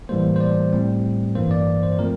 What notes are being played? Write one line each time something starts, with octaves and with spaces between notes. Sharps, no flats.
A2 E3 G3 A#3 C5
C5
D5
A2 G3 C4
G2 E3 A#3 C5
D5
C5
F3 A3 C4 A#4